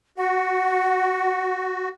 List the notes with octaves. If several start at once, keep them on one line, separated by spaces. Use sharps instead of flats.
F#4 F#5